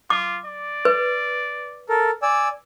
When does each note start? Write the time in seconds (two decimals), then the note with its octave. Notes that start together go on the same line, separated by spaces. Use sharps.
0.10 F4 D6
0.45 D5
0.85 B4
1.89 A4 A#4
2.22 D5 G#5 E6